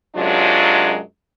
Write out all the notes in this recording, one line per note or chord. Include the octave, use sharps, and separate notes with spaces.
F#2 C3 F#3 G#3 D4 F4